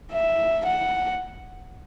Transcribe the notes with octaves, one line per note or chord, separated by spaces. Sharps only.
E5
F#5